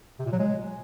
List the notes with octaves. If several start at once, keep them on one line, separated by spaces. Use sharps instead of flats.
C3
A#2
F#3
G#3